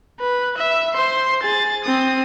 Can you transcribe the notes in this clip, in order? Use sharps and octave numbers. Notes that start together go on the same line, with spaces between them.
B4
E5
C5 C6
G#4 A6
C4 D#6